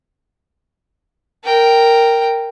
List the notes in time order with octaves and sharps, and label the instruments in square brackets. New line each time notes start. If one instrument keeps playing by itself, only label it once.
[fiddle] A#4 G5